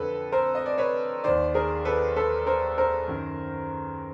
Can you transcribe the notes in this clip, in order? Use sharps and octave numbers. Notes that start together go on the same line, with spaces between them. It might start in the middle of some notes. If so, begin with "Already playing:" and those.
Already playing: F2 D3 A4 B4
A#4 C5
D#5
D5
B4 C#5
D#2 D#3 C5 D5
G#4 A#4
A4 B4
A4 B4
A#4 C5
A#4 C5
F#2 D#3